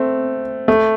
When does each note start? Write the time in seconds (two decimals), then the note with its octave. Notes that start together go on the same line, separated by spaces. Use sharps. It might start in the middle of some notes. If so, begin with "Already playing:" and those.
Already playing: A3 C4
0.68 A3